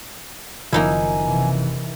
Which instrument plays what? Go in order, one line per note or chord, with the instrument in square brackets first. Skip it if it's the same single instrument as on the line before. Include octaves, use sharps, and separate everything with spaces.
[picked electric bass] F#1 D#3 F3 [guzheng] A#3 D#4 E4 [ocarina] G#5
[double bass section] C3 E3